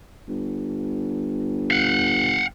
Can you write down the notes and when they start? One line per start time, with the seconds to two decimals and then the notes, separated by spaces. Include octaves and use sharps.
0.28 G1
1.71 F5 F#5